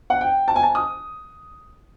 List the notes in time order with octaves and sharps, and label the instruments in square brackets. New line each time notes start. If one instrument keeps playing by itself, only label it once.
[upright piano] F#5
G5
A5
G#5
A5
D#6